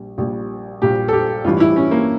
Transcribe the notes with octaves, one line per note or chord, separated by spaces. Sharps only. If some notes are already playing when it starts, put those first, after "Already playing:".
Already playing: A#1 G3
A#1 A#2 G3
A#1 A#2 G3 G4
A4
G4
A1 G2 E3 G3 F4
E4
C#4
A#3